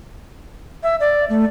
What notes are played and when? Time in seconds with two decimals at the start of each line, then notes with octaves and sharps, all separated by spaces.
0.83 E5
1.00 D5
1.30 A3